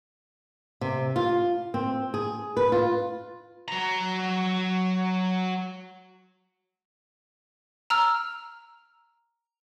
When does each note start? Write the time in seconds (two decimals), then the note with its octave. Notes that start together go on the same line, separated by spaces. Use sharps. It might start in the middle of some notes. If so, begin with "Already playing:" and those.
0.81 C3
1.16 F4
1.74 C4
2.14 G#4
2.57 B4
2.72 F4
3.68 F#3 A#5
7.90 A#5 E6 F6